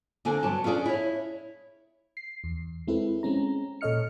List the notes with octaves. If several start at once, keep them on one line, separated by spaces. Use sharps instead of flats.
D3 A#3 C4 D4 G#5
G2 C3 F#3 A5
C#4 D4 F4 G#4 D5
E4 C#5
C7
E2
G#3 C4 E4 A4 B4
G#3 C4 C#4 A#5
A#2 A4 C#5 D#5 F6 C#7